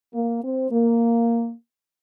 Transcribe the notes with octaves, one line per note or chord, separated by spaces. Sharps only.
A#3
C4
A#3